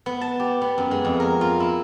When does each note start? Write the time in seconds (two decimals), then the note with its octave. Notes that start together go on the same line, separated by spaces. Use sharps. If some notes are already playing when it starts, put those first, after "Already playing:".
0.06 B3
0.21 A5
0.40 G4
0.62 B3
0.78 F#2
0.91 G#3
1.05 F2
1.20 A#4
1.41 F4
1.60 E4